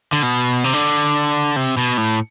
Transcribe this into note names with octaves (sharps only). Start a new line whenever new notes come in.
D3
B2
C3
D3
C3
B2
A2